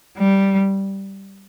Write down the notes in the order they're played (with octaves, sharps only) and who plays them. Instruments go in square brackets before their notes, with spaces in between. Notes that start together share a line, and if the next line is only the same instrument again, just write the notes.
[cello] G3